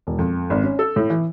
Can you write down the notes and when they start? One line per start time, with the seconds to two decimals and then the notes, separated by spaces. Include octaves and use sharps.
0.07 E1
0.19 F2
0.50 G#1
0.64 C#4
0.79 A4
0.96 A2
1.10 E3